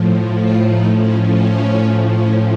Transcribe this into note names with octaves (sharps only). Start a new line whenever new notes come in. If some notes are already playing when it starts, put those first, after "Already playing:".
Already playing: A2 F3
F4
D#4
A2 F3 C#4
C#4
C#4